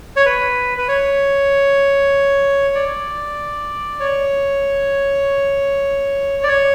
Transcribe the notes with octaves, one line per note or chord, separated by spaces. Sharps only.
C#5
B4
B4
C#5
D5
C#5
D5
C#5